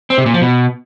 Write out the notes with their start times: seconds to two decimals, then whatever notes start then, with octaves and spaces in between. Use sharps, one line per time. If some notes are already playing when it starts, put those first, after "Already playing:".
0.10 C4
0.18 C3
0.26 A#2
0.34 F3
0.42 B2